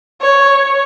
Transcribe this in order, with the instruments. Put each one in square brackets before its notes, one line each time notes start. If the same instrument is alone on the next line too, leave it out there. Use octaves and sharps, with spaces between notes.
[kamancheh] C#5